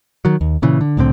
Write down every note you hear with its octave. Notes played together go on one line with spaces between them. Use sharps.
D#3 F#3
D#2
A#2 C#3 E3
D3
C2 A2 D3 C4